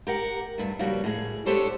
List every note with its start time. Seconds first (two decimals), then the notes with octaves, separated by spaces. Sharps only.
0.07 G4 A#4 F#5
0.58 G2 A3
0.79 C#3 F3 G3 A#3 F#4
1.04 A2 G#4
1.46 B3 D4 G4 A4 C5 C#5